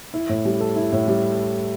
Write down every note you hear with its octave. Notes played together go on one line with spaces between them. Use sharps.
E4
A2
G3
A4
E4
A2
G3